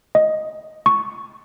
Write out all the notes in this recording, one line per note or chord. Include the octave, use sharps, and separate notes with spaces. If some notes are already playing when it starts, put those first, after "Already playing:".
D#5
C#6